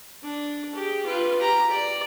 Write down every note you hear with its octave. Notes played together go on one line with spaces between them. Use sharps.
D4
G4 G#4
F4 B4
G4 A#5
D5